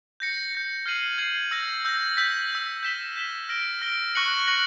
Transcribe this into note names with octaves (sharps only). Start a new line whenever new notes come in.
G6 A#6 C#7
G6 A#6 C#7
F6 G#6 C7 D#7 F#7
F6 G#6 C7 D#7 F#7
E6 G6 A#6
E6 G6 A#6
E6 G6 B6
E6 G6 B6
G6 B6 E7 G7
G6 B6 E7 G7
F6 A#6 D7 G7
F6 A#6 D7 G7
C#6 F#6 A#6 C#7 F#7
C#6 F#6 A#6 C#7 F#7